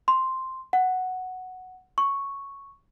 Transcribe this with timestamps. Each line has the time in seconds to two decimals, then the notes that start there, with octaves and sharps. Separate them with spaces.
0.08 C6
0.73 F#5
1.98 C#6